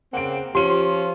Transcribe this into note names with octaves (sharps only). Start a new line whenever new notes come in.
C#3 A#3 C4 F#5 D7
F3 C#4 F4 G4 C6 D#7